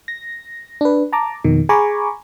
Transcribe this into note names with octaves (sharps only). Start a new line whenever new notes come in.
A#6
D4 B4
A5 A#5 D6
F2 B2 D#3
G#4 G#5 A#5 B5 C#6 D6